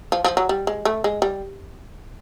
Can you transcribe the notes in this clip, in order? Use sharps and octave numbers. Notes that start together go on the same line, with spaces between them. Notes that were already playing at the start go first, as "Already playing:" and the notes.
F3
F3
F#3
G3
G#3
A3
G#3
G3